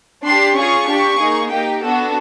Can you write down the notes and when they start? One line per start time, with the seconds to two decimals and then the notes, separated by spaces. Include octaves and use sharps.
0.24 D4 G4 C6
0.56 C#4 F4 G#4 C#6
0.87 D4 G4
1.18 A#3 D#4 G#4
1.49 A#3 D#4 G4 G5
1.80 B3 D4 F#4 A4